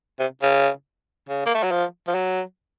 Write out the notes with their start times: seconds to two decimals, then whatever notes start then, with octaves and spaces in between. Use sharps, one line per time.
0.19 C3
0.42 C#3
1.29 C#3
1.46 A#3
1.54 A3
1.63 F#3
1.71 F3
2.07 F3
2.15 F#3